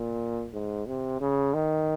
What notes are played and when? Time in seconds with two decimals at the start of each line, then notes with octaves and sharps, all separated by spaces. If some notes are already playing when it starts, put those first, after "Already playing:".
Already playing: A#2
0.53 G#2
0.87 C3
1.20 C#3
1.54 D#3